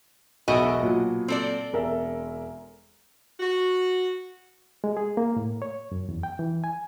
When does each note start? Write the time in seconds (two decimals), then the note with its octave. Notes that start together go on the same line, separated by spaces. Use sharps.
0.48 E1 B1 B2 F#4 D#5 E5
0.82 A#2 F#3
1.28 C4 A4 D5
1.73 E1 A#4 E5
3.40 F#4
4.84 G#3
4.97 G#4
5.17 A#3
5.36 A2
5.62 C#5
5.92 F#2
6.09 E2
6.23 G5
6.39 E3
6.64 G#5